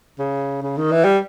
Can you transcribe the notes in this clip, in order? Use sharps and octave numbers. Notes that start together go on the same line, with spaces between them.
C#3
C#3
D#3
E3
G3